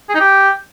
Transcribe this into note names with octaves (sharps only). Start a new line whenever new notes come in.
G#4
D#4
G4